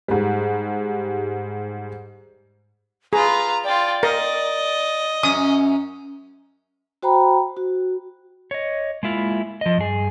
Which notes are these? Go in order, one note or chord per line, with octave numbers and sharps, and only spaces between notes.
G#2 G3
F4 G#4 B4 A#5
F4 D5 G5
A#4 D#5
F#2 C#4 D#6
F#4 C5 G5 A#5 B5
F#4
C#5 D#5
G#3 A#3 E4 F4
F3 D#5
G2 G#4